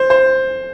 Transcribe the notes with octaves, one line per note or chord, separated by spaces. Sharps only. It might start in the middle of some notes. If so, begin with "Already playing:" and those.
Already playing: C5
C5